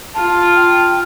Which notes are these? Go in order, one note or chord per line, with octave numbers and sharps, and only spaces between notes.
F4 A5
G5